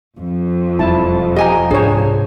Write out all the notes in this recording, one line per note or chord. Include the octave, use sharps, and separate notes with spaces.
F2
E1 G3 E4 A5
G4 D#5 G#5 A#5
C2 G#2 D4 G#4 C5 C#5